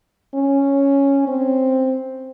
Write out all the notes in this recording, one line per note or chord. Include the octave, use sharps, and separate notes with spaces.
C#4
C4